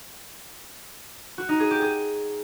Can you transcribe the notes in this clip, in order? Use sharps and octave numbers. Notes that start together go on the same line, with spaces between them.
F#4
D#4
G#4
G4
G#4